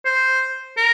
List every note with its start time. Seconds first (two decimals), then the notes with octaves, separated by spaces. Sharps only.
0.06 C5
0.78 A#4